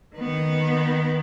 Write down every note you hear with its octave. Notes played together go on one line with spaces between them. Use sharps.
D#3 B3